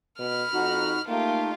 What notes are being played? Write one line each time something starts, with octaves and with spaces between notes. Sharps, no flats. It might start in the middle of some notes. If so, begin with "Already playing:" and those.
B2 B5 F6
F2 D#4 F#4
A3 A#3 D#4 F4 G4